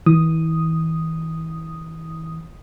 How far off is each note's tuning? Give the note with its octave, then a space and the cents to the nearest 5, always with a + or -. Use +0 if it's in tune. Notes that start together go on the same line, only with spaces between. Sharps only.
E3 -35 D#6 +0